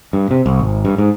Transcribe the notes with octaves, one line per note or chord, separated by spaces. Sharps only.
G2
C3
C2
G#1
G2
G#2